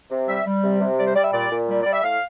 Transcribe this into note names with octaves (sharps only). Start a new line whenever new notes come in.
C3
G3 E5
G3
C3
C3
G3 D5
C5
G3 D5
E5
A#2 D5
A#2
G3
G3 D5
E5
A2 F5